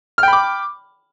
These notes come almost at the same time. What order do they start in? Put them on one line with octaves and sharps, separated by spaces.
F6 G5 B5 D6